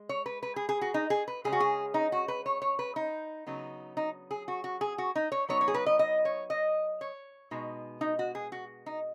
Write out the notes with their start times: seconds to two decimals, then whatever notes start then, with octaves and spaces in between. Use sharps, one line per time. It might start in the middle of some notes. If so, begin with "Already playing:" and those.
Already playing: G#3
0.09 C#5
0.26 B4
0.43 B4
0.56 G#4
0.69 G#4
0.81 F#4
0.94 D#4
1.10 G#4
1.28 B4
1.44 C#3 G#3 C#4 G#4
1.52 F#4
1.60 G#4
1.94 D#4
2.12 F#4
2.28 B4
2.46 C#5
2.62 C#5
2.79 B4
2.96 D#4
3.46 C#3 F#3 B3 D#4
3.97 D#4
4.31 G#4
4.48 F#4
4.64 F#4
4.81 G#4
4.98 F#4
5.15 D#4
5.32 C#5
5.49 F#3 B3 D#4 C#5
5.61 C#5
5.68 G#4
5.74 B4
5.86 D#5
5.99 D#5
6.25 C#5
6.50 D#5
7.01 C#5
7.51 B2 G#3 D#4
8.01 D#4
8.19 F#4
8.35 G#4
8.52 F#4
8.86 D#4